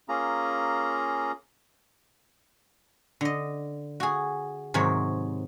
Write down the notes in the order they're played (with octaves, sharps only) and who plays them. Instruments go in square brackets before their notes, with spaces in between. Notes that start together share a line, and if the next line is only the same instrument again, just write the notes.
[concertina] A#3 C#4 F4 G#4 A#5
[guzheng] D3 D#5
F#4 G#4
G#2 C3 D#3 F#3 C#5